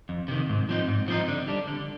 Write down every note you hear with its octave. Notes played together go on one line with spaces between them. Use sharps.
F2
C3 D#3
G#2
F3 C4 D#4
G#2
F3 C4 D#4
D3
G3 D4
D3